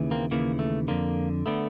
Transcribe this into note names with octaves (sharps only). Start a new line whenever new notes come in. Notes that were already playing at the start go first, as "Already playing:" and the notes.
Already playing: D#2 C#3 E3
A#3 C4
D#2 C#3 E3 A#3
A3
F2 D3 A#3
D3 A3 B3